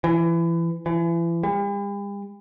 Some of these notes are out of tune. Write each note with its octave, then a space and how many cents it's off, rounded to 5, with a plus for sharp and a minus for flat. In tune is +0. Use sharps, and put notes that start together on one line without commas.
E3 +25
E3 +35
G3 +45